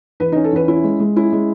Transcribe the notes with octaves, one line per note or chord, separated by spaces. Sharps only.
E2 B4
D#4
C#4
A4
E2 B4
C#4 E4
G#3
G#3
C#4 E4
G#3